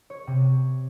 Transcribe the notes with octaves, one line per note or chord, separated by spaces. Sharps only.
C#5
C3